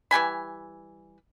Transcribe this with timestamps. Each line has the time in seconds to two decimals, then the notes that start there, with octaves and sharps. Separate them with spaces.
0.11 E3 G3 G#5 B5